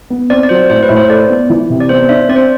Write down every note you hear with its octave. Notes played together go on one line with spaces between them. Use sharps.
B3
C4 D5
D5
F#3 C5
A2 C5
B4
A2
C5
A4 D5
B3
E3
C3
D5
B3 C5
D4 E5
C4 D5
C5